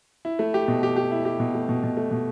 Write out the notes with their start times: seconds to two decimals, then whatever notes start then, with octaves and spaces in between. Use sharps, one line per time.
0.25 E4
0.39 A3
0.54 G4
0.68 B2
0.83 G4
0.96 G4
1.11 E4
1.25 G4
1.40 B2
1.55 A3
1.69 B2
1.84 B2
1.97 A3
2.11 B2